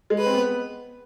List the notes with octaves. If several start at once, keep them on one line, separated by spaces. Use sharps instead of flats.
G#3
B4
C4
B3